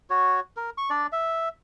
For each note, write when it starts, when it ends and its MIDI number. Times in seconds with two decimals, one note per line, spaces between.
0.10 0.40 66
0.10 0.40 73
0.57 0.70 70
0.78 0.90 85
0.90 1.07 62
0.90 1.07 74
1.12 1.49 76